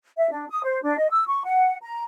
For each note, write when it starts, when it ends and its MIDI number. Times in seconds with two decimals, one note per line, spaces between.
0.18 0.29 76
0.31 0.46 62
0.49 0.63 87
0.64 0.80 72
0.83 0.95 62
0.98 1.10 75
1.10 1.24 88
1.27 1.44 85
1.44 1.76 78
1.82 2.05 82